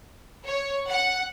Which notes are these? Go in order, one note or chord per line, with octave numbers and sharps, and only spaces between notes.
C#5
F#5